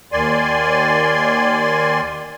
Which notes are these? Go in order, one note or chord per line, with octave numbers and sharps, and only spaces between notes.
D#2 D#3 D5 G#5 C6